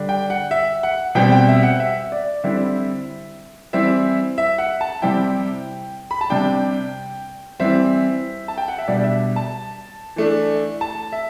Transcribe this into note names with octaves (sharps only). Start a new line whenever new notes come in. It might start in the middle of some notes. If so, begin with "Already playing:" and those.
Already playing: D3 G3 D4
G5
F#5
E5
F#5
B2 G3 C4 G5
G5
E5
F#5
E5
D5
D3 G3 C4 E4 E5
E3 G3 C4 E4 E5
E5
F#5
A5
C3 G3 C4 E4 G5
B5
A5
C3 G3 D4 G5
E3 G3 C4 E5
A5
G5
F#5
E5
B2 G3 D4 D5
E5
A5
E3 A3 D4
A5
E5